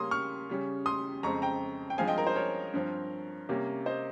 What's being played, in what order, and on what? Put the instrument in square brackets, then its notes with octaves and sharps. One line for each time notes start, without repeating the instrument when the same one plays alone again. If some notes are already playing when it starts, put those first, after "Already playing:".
Already playing: [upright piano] C#3 G3 A#3 C#4 C6 D#6
C#6 F6
C#3 G3 C#4
C6 D#6
F2 C#3 G#3 C4 A#5 C#6
G5 A#5
G5
G2 F3 G#3 C4 F5 G#5
D#5 G5
A#4
C5
A#4 C#5
G2 F3 C4
C3 G3 A#3 C#4
C5 D#5